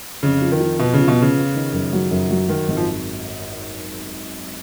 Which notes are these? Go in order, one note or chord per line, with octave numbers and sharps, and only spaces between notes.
F2 C#3
F3
D#3
F3
B2 B3
C#3 F3
B2
B3
C#3
B3
D#3
F#2
F#3
F#2
F#3
D#3 F#3
G#1
F3